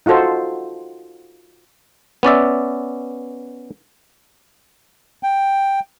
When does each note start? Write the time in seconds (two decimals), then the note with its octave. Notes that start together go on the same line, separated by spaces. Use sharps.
0.06 D#4 F4 F#4 A4 C5
2.23 B3 C#4 D5 E5
5.23 G5